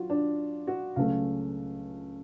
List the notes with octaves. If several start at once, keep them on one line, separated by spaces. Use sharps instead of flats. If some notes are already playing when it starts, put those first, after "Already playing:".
Already playing: F#3 F4 F#4
D4
F#4
C#2 C#3 F#3 A3 F5